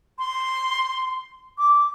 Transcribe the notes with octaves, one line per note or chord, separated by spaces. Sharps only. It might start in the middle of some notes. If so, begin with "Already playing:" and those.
C6
D6